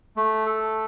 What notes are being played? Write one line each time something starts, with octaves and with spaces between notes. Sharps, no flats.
A3
A4